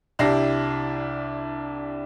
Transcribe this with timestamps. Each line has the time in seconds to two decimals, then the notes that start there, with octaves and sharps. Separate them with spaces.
0.19 C2 D4 E4 G4 A#6 C7